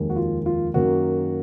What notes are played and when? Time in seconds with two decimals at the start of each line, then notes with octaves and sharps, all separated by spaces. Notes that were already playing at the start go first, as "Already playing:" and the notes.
Already playing: F1 D#2 D#3 G#3
0.10 F#4
0.16 F4
0.46 F4
0.74 F#2 D#3 A#3 F#4